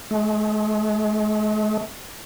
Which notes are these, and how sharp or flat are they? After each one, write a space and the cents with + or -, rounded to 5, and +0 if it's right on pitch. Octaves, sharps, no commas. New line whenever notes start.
G#3 +45